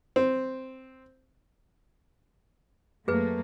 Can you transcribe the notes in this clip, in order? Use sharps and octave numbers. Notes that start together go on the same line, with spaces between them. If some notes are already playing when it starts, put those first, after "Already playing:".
C4
F#2 A3 A#3 G#4 B4